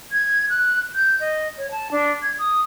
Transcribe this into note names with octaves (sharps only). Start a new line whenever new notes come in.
G#6
F#6
G6
D#5
C#5
A5
D4
G#6
D#6